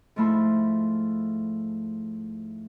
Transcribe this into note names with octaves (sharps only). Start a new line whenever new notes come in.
G#2 F3 A3 E4 B5 C6